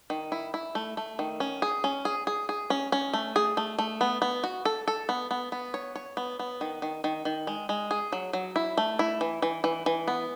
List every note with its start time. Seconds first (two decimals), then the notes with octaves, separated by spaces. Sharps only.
0.10 D#3
0.32 E4
0.54 E4
0.75 A3
0.97 A3
1.19 D#3
1.40 C#4
1.62 G#4
1.84 C#4
2.05 G#4
2.27 G#4
2.49 G#4
2.70 C#4
2.92 C#4
3.14 A3
3.36 G#4
3.57 A3
3.79 A3
4.01 B3
4.22 B3
4.44 F#4
4.65 A4
4.88 A4
5.09 B3
5.31 B3
5.52 B3
5.74 C#5
5.96 C#5
6.17 B3
6.39 B3
6.61 D#3
6.82 D#3
7.04 D#3
7.25 D#3
7.47 G#3
7.69 G#3
7.91 G#4
8.12 F#3
8.33 F#3
8.56 E4
8.78 A3
8.99 E4
9.21 E3
9.42 E3
9.64 E3
9.86 E3
10.08 B3